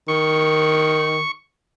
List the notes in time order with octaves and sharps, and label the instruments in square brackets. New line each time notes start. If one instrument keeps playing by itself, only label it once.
[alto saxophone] D#3 [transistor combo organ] C#6